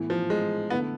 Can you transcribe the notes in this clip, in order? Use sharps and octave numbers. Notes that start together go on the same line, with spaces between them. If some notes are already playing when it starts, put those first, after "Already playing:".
Already playing: A2 E3 B3 E4
F3
G#3
D3 A3 B3 E4